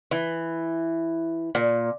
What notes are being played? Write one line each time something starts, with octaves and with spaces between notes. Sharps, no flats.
E3
A#2